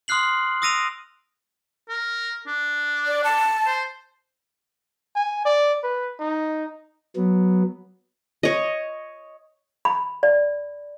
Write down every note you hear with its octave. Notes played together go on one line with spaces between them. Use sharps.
C6 D#6 F6 F#6 C7 F#7
D#6 E6 A#6 D7 D#7 F7
A#4
D4
D5
A5
C5
G#5
D5
B4
D#4
F#3 B3
C#5 D#5
B5
D5